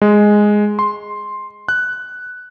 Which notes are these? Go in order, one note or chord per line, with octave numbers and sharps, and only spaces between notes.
G#3
C6
F#6